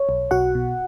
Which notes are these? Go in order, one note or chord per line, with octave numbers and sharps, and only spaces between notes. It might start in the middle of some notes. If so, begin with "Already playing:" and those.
Already playing: C#5
B1
B1 F#4 F#5
B2